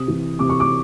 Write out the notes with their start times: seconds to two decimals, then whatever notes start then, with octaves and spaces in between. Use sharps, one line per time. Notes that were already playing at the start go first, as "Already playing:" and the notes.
Already playing: C3 D#6
0.08 E3
0.39 C3 D6
0.49 C#6
0.60 D6